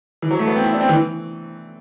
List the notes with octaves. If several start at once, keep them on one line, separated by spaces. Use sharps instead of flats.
E3
F#3
A3
B3
C4
E4
D4
C4
E3